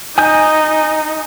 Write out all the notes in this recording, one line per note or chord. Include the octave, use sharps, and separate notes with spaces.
D#4 G#5 D#6 G6